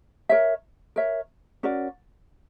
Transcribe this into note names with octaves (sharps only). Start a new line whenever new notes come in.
A#4 C#5 E5
A#4 C#5 E5
C#4 F#4 A#4 D5